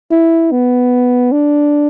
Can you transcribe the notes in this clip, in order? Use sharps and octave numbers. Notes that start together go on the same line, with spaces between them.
E4
B3
D4